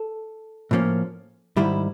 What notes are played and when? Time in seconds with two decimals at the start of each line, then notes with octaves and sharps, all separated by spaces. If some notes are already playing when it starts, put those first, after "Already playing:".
Already playing: A4
0.71 A2 F3 A#3 C#4
1.57 G#2 D#3 G3 E4